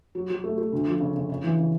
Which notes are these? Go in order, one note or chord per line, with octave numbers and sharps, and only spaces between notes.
F#3
F#3
A3
A3
D2
F3
C#3
C#3
C#3
E3
C#3